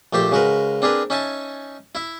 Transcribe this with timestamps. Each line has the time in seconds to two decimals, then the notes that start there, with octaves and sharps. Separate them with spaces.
0.13 A#1 A3 G4 C5 G5
0.32 C#3 G#3 F#4 A#4 B4
0.82 C4 D4 G#4 A#4 B4
1.10 C#4 D#4 E5 G#5 A5
1.95 E4 E5